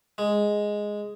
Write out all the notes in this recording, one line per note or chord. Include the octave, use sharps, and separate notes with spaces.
G#3